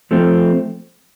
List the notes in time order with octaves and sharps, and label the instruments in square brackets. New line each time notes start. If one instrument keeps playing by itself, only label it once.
[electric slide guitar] F3 A3 C4